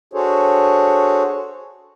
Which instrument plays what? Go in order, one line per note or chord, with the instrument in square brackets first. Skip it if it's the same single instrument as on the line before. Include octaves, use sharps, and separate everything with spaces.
[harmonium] D4 F#4 G#4 A4 C5 C#5